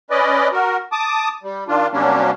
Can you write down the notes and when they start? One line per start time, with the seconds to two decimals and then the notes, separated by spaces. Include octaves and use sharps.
0.11 C#4 B4 D5 D#5
0.52 F#4 A#4
0.92 A5 D6 D#6
1.43 G3
1.68 D#3 D4 F4
1.93 C3 F#3 G3 A#3 C#4 D4